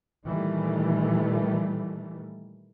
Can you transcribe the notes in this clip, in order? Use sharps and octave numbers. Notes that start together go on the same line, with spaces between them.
A#2 D#3 E3 G3 A3